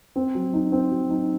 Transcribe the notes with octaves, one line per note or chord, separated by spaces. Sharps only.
C4
F#3
D#4
C4
F#3
D#4